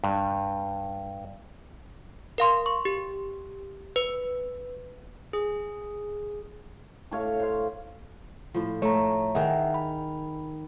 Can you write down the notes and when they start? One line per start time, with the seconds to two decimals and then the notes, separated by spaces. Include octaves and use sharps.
0.04 G2
2.38 A#4 F5 C6
2.66 C#6
2.85 G4
3.96 B4
5.33 G#4
7.11 A2 C#5 F5
7.40 C5 F5
8.54 A2 F3
8.82 A3 C#5 A#5
9.35 D#3 G#4 E5 F#5
9.74 B5